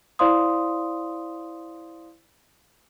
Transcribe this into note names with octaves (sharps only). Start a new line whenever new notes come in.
E4 C5 D5 F5 C6 D#6